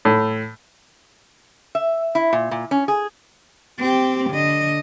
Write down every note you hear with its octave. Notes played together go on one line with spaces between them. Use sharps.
A2
E5
E4
A#2
A#2
C#4
G#4
C4 G4
D3 D#5